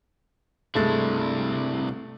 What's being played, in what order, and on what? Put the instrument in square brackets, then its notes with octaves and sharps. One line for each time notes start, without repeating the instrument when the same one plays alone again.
[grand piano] G2 G#3 A6 [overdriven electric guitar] C3 E4 [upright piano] A3